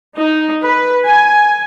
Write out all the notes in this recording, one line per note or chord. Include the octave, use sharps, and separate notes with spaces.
D#4
B4
G#5